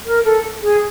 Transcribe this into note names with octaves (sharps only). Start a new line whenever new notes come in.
A#4
A4
G#4